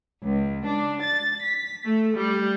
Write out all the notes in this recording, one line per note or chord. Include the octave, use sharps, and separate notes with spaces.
C#2
D4
A6
B6
A3
G3